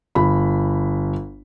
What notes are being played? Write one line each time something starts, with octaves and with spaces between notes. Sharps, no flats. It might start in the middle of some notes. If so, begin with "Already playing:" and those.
G1 B5